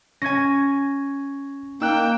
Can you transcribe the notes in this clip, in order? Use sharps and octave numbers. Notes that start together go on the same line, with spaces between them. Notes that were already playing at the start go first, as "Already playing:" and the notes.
C#4 G#5 G#6 A#6
A#3 D#4 G5 E6 F#6